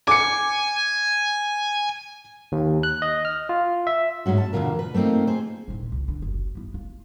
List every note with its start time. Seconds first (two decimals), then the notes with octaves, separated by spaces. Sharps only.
0.08 G#5 D6 C#7
2.52 D#2
2.83 F#6
3.02 D#5
3.25 F6
3.49 F4
3.87 E5
4.26 G#2 G#3 C#4 F#4
4.38 A5
4.53 E2 B2 D3 F#3 F4 A#4
4.79 B4
4.94 A3 A#3 C4 D#4 F4
5.27 G#4 C5
5.68 D#1 E4
5.92 C#2
6.08 D3
6.22 F#1
6.55 B3 E4
6.74 F4